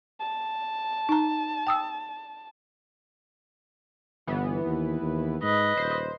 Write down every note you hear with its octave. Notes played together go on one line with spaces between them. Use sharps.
A5
D#4 A#5
G5 D#6 E6
G1 E3 B3
D#2
D#2
G#2 B4 D#5
D#1 C5